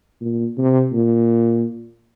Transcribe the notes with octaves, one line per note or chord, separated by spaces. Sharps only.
A#2
C3
A#2